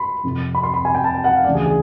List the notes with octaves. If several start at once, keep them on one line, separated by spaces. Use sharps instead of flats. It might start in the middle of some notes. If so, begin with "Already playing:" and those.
Already playing: B5 C6
F2 C3 F3
B5
C6
B5
G#5
G5
A5
G5
F#5
F5
D2 C#3 E3 D5
G#4
G#4